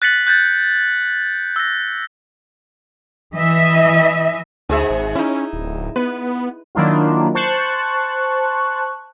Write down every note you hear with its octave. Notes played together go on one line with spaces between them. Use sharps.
F#6 A6 B6 C#7 F#7
F#6 G6 A6
E6 A#6
E3 D#5 E5
D2 G#2 G#4 E5
G#1
C#4 D#4 E4
D1
B3 B4
D#3 F#3 A#3 D4 E4 F4
C5 A5 C#6 F#6